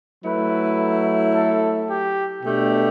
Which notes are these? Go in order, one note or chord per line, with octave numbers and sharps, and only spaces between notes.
F#3 A3 E4 B4
A4
G4
B2 A3 D4 G4